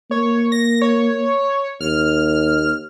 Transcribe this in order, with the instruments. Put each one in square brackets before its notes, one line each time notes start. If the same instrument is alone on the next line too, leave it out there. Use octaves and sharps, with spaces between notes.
[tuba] A#3 [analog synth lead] C#5
[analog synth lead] A#6
C#5
[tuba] D#2 [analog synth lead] F6